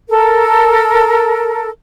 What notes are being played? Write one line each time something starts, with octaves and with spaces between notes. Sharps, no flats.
A4 A#4